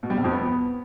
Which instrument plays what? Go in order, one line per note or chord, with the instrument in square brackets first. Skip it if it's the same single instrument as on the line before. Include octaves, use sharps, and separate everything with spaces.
[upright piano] B2
G3
C3
F2
B3